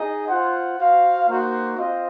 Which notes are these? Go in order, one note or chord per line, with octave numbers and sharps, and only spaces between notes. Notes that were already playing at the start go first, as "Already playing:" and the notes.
Already playing: D#4 G#4 D#5
F4 C5 F#5
F#4 C5 F5
A#3 D#4 F#4 C5
C4 F4 C5 D#5